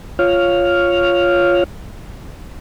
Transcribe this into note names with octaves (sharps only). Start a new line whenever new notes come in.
F4 C#5 F6